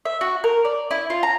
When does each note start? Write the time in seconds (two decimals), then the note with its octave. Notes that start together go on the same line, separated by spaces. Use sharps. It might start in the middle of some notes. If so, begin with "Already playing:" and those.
0.05 E5
0.21 F#4
0.44 A#4
0.65 D5
0.91 E4
1.10 F4
1.23 A#5